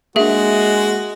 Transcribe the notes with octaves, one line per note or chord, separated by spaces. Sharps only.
G#3 A#3 D4 F#4 G#4 E5